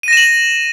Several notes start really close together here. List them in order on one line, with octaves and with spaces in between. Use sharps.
D#7 A#6 E7 F#7